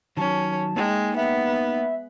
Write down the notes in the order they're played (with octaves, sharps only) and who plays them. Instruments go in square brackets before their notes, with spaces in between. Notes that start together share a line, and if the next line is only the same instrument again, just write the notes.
[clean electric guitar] D#3 F#3 [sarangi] C#4 [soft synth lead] A5
[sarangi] G#3 [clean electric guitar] A#3 D#4 G5
[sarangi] B3 [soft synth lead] E5